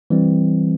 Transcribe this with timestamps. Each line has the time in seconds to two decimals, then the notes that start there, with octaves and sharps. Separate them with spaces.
0.10 E3 G3 C4